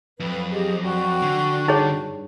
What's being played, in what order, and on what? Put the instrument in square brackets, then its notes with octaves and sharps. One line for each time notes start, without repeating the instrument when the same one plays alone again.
[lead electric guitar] F2 [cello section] F3 F#3 [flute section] B4
[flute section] G4 G#4 D#5
F#4 D5 G5
[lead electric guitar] D3
[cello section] G2 [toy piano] D#4 G#4 C#5